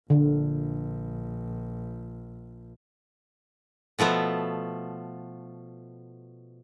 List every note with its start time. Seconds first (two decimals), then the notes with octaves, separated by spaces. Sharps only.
0.10 A#1 D3
3.99 B2 F3 A3 B3